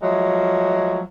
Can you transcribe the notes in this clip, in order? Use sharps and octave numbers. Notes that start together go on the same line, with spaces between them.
F3 F#3 G#3 A3